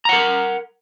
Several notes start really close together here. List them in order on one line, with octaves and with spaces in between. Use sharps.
A#5 F#5 A#4